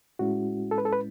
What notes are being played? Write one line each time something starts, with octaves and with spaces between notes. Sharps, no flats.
A2 G#3 C#4 E4 F#4
A4
B4
A4
B4